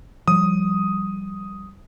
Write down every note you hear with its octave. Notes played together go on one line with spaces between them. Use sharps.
F3 G3 D#6